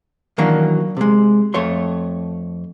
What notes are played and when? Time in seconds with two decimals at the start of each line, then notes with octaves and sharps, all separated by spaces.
0.38 D#3 E3 F#3 A#3 D4 F#4
0.97 C3 G#3
1.54 F2 A3 C#5 C6